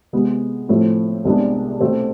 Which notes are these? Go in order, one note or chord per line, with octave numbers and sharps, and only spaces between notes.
C3 G#3 B3
A2 F3 A3 C4
C2 C3 G#3 B3 D4
B2 A3 C4